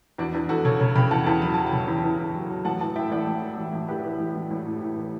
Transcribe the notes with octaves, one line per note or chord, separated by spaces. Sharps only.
E2 D4 F#4
E2 D4
E2 F#4 A4
C#3 A4 C#5
C#3 A4 C#5
C#3 G5 B5
E2 F#5 A5
E2 F#5 A5
F#3 B5
F#3 A5
G5 B5
C#3
E2
E2
E2
F#3
F#3
A1 F#5 A5
E3 F#5 A5
A2 E5 G5
A1 D5 F#5
A1
E3
A1
A1
E3 G4 B4
E3
A1
A1
A1
A2
A2
E3